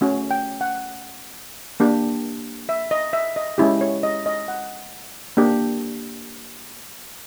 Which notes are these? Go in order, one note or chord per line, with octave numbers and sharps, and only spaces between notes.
A3 C#4 F#4
G5
F#5
A#3 D4 G4
E5
D#5
E5
D#5
G#3 C#4 E4 G4
C#5
D#5
D#5
F#5
A#3 D4 G4